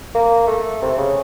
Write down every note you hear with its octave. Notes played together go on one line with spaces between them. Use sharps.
A#3
A3
C3
C#3